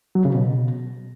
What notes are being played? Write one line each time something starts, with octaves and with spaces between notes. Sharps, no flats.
F#3
C#3
B2